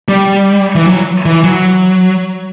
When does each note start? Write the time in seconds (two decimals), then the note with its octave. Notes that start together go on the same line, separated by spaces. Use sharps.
0.08 G3
0.75 E3
0.86 F#3
1.25 E3
1.44 F#3